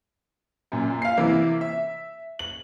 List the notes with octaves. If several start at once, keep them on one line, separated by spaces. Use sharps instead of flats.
F#2 A#2
F5 C7
C3 E3 A#3 E4
E5
F#7